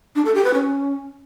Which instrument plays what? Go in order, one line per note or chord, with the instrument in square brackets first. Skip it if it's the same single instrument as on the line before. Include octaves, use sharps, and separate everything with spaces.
[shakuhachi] D4
A4
G4
B4
C#4